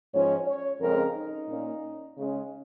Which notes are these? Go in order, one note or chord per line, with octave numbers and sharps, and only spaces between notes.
G#2 F3 C#4 C#5
C#5
F2 C#3 G#3 C#4 A#4
D#4
A#2 A#3 C#4
C#3 G#3 C#4